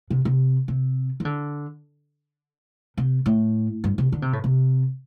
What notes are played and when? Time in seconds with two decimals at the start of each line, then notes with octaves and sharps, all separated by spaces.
0.10 C3
0.25 C3
0.68 C3
1.20 E3
1.25 D3
2.97 C3
3.26 A2
3.84 G2
3.98 C3
4.12 D3
4.22 C3
4.33 A2
4.44 C3